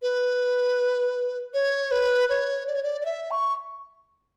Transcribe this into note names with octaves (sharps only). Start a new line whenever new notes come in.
B4
C#5
B4
C#5
D5
C#5
D5
D5
E5
C#6